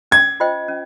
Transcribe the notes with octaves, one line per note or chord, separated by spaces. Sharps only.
C#4 G#6
F4 C5 D#5 G5
C#4